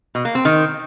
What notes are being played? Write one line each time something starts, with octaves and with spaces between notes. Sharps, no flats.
B2
A#3
C4
D#3